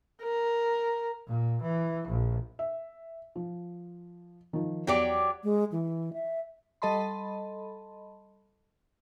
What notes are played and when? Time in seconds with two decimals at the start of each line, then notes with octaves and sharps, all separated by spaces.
0.22 A#4
1.27 A#2
1.62 E3
2.08 A#1
2.59 E5
3.36 F3
4.53 D#3 F3
4.87 E2 F#3 G4 D5
5.44 G#3
5.72 E3
6.13 E5
6.82 G3 A4 D#5 A5 B5 C6